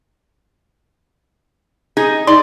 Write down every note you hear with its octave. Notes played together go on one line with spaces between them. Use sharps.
D#4 G#4
D#4 D5 C6